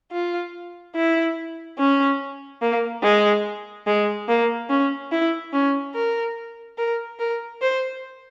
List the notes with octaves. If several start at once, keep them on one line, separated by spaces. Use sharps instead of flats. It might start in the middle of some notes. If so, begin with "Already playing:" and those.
F4
E4
C#4
A#3
G#3
G#3
A#3
C#4
E4
C#4
A#4
A#4
A#4
C5